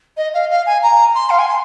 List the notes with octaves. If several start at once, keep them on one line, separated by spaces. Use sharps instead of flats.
D#5
F5
F5
G#5
A#5
C6
F5
G#5
C6